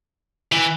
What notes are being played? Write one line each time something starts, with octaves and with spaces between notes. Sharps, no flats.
E3